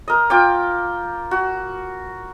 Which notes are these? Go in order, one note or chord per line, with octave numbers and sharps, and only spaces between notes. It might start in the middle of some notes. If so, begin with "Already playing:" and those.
A#4 D#5
F4 G5 D6
F#4